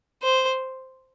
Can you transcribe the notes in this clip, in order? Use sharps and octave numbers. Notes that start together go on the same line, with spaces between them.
C5